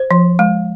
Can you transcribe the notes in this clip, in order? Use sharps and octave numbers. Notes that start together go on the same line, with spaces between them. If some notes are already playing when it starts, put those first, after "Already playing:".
Already playing: C5
F3
G#3